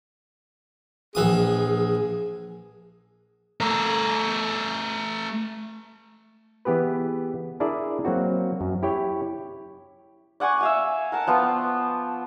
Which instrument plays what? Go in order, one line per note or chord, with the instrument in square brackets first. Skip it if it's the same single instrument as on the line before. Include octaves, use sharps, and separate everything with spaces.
[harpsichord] A#1 E3 D#6 [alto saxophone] G#4
[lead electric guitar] A3 A#4
[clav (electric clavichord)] E3 B3 G4 G#4 B4
D4 E4 G#4 A#4 D5 E5
F#3 A#3 C4 F#4
F#2
E4 G4 C#5 G5
[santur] D5 F#5 G#5 C#6
E5 F5 G#5
A#4 F#5 A5
F3 B3 F4 G5